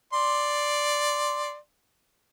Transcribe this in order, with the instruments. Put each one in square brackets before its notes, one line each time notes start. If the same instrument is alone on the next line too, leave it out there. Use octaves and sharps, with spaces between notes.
[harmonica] D5 C6